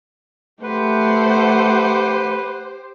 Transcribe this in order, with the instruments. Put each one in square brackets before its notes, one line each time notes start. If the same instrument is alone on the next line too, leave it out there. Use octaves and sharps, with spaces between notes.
[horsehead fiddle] A3 F#5 [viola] G4 C5 [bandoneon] B4